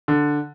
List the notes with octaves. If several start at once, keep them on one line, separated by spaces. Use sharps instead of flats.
D3